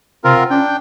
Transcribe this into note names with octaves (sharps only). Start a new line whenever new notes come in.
C3 C4 F4 A#4
F#5
C#4 D4 G5
G6